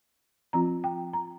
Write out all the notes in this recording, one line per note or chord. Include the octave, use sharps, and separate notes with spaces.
F3 C4 F4 A#5
G5
A#5